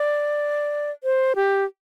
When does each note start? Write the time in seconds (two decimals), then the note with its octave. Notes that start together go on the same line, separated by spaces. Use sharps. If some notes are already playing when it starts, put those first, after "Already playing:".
Already playing: D5
1.04 C5
1.36 G4